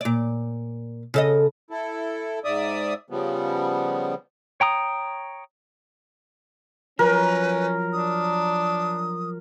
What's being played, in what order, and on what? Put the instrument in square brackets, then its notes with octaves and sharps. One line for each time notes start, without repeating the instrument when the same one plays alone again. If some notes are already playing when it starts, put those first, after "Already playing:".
[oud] A#2 D5
C#3 A4 D#5
[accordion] E4 A4
G#2 D5 E5 D#6
C#3 F3 G3 B3
[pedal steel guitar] C#5 G5 A#5 D#6
[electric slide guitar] F3 F#3 [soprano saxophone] C#4 [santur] A#4 [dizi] B4
[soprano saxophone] D4 [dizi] D#6